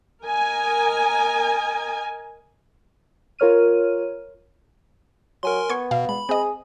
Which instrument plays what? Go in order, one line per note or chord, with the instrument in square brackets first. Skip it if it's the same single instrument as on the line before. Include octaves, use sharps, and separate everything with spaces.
[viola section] A#4 D#5 G#5
[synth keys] F4 A#4 C#5 F6 D#7
[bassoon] F#3 [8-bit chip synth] A#4 G#5 C6
[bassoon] B3 [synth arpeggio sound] C#6 G#6
[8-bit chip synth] B2 [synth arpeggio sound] F5
[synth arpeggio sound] G#3 [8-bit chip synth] B5
[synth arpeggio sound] C4 D#5 [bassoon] G#4